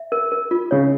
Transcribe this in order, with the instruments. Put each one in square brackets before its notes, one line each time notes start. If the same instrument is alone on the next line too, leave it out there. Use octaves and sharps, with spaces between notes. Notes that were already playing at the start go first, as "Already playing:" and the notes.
Already playing: [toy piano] E5
A#4
A#4
F4
[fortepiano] C#3 [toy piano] C#5